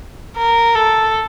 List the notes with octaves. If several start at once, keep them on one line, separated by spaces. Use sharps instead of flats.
A#4
A4